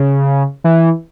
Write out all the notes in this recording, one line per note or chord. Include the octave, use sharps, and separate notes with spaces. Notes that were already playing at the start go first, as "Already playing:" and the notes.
Already playing: C#3
E3